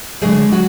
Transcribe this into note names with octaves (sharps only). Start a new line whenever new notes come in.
D3 F#3 G#3 A3 G#4
F#3 F#4